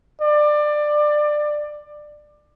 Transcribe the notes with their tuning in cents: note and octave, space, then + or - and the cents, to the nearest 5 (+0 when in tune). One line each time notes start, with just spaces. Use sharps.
D5 +20